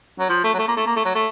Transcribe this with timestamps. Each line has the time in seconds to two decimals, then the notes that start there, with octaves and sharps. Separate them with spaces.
0.20 F#3
0.29 F3
0.44 A3
0.54 F#3
0.59 A3
0.68 A#3
0.77 A3
0.86 A#3
0.96 A3
1.05 F#3
1.15 A3